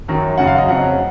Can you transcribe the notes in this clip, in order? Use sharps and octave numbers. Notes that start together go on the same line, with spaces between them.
F#2 D#3 F#3
F#2 C#3 F#3 F#5
F5
D#5
F2 C#3 F#3 F#5